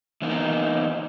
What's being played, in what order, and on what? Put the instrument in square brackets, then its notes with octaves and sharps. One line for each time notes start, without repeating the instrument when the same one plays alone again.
[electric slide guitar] E3 A#3 B3 D#4 A#4